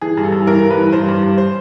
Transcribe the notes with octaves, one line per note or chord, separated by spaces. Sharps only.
E3 G#4
G2
A4
G2
E3 A#4
G2
B4
E3
G2 C5
G2
G2
C5